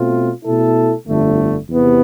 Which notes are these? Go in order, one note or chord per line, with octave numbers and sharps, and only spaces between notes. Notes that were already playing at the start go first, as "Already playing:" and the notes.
Already playing: B2 A3 C4 F4
B2 A3 E4 A4
G1 F2 D3 A3
E2 C3 E3 B3